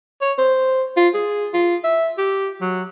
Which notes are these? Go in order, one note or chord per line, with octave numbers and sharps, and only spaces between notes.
C#5
C5
F4
G#4
F4
E5
G4
F#3